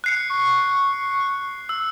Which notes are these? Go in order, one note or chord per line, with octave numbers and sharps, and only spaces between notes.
F#6 C7 C#7
C#6
E6